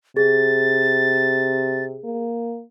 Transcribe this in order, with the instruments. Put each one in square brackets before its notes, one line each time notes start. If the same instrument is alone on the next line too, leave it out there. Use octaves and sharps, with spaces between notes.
[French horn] C3 [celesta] G#4 [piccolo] A6
[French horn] A#3